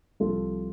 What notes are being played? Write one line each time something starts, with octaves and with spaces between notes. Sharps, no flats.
C2 C3 F3 F4 A4